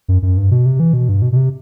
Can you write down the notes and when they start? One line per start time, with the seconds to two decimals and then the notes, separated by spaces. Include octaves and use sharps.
0.08 F#2
0.22 F#2
0.37 G2
0.51 B2
0.66 C3
0.80 E3
0.93 B2
1.09 G2
1.22 B2
1.32 B2
1.36 C3